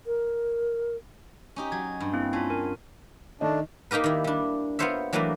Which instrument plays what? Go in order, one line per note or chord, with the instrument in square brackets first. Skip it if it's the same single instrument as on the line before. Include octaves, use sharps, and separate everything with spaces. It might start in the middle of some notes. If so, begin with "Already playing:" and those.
[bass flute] A#4
[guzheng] C#4 D#4 G4
[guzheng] F#3 [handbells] G#6
[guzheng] G2
[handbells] A#3 C4 E4
[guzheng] C#4 [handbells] D4 F4
[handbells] C4 A#4 G#5
[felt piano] D#3 D#5 [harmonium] A3 D4
[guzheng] A#3 D#4 G4 A#4 B4
D#3 E4
G3 D4
B3 F4 A#4 C5 C#5 E5
E3 F#3 A3 A#3 D4 B4